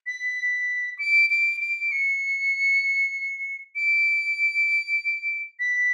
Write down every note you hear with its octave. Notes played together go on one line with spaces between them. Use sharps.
B6
D7
D7
D7
C#7
D7
B6